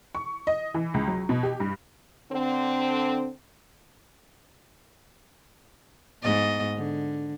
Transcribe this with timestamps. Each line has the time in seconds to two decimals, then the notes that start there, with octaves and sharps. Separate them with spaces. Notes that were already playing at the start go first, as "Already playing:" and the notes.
0.15 C#6
0.47 D#5
0.74 E3
0.94 C#2
1.08 F#3
1.29 B2
1.43 G4
1.60 G2
2.32 D3 C4
6.23 G#2 B3 D#5
6.76 D3